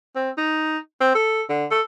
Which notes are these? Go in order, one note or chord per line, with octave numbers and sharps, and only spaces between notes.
C4
D#4
C4
A4
D3
A4